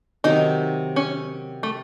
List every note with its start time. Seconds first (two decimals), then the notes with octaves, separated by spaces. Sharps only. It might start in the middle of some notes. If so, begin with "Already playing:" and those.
0.24 C3 D#3 F#3 D#4
0.96 C#4
1.63 A3